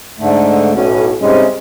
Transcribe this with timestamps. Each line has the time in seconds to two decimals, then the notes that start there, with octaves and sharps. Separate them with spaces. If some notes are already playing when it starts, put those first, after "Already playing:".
0.19 G#2 D3 A3
0.75 B1 A2 C#4
1.21 G#2 C3 G3 G#3 C#4